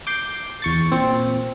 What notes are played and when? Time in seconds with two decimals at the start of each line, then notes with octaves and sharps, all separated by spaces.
0.07 D6 G6 C7
0.62 E2 C#6 A6
0.92 A#2 C4